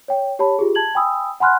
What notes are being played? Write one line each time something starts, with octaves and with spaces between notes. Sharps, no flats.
C#5 G5
G4 C#5 A5 B5
F4 G4 G#4
A5 G#6 F#7
G5 G#5 B5 D#6 E6
F#5 G#5 B5 C6 F6 F#6